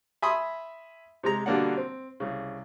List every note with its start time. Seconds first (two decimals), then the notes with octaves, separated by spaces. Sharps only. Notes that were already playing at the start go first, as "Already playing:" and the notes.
0.22 E5 G#5 B5 C6 D#6
1.23 C3 G#3 A#5
1.46 B2 D3 G3 A#3 D4 F#5
1.77 C4
2.20 C2 C#3